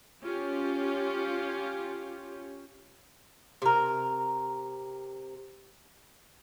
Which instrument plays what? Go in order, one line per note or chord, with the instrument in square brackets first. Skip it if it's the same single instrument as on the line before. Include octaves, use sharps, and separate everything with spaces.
[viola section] C#4 F4 G4
[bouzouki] C3 A#4